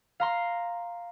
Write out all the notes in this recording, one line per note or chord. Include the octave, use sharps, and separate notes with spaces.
F5 A#5 C6